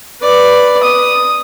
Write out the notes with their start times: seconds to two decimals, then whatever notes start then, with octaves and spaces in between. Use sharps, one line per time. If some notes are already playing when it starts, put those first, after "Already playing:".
0.21 B4 D5
0.83 D#6